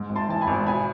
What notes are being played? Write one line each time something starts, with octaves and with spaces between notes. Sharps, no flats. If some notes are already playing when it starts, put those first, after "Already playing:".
Already playing: G#2
G#1
A5 C6
E3 A5
G#5 B5
G#1
B2 G#5 B5